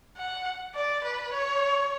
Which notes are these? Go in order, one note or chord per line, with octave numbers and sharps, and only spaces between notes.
F#5
D5
B4
C#5